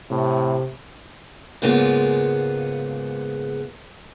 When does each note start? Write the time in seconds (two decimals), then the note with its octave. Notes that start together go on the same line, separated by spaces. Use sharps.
0.11 A2 C3
1.62 G#2 C#3 G#3 A#3 B3 F4